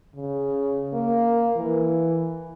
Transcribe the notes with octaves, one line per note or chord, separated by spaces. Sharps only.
C#3
A#3
E3